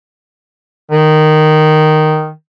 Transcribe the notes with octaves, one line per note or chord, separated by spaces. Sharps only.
D#3